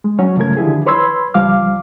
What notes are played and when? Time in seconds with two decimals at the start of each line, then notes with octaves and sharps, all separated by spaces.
0.04 G#3
0.19 F#3 C#4 F#4 C#5
0.36 G2 C#3 F3 A3 A#4 G#6
0.57 D3 D#3 F3 E4 G4 G#4
0.86 B4 C#5 B5 C6 E6 G#6
1.34 C#2 F3 G3 F5 D6 F6